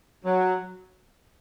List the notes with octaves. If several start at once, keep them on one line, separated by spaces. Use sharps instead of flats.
F#3